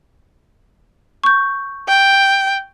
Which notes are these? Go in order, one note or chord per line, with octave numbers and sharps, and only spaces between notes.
C#6 G6
G5